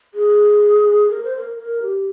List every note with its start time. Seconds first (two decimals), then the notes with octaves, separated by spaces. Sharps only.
0.14 G#4
1.10 A#4
1.24 C5
1.37 A#4
1.58 A#4
1.82 G4